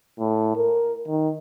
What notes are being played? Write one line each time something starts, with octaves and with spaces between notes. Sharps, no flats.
A2
A#4
D#3